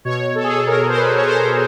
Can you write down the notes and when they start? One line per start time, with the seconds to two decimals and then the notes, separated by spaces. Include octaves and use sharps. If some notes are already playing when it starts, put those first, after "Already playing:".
0.05 B2 C#5
0.35 A4
0.43 G#4
0.50 A4
0.67 A#4
0.89 C5
0.97 B4
1.17 C#5
1.28 C5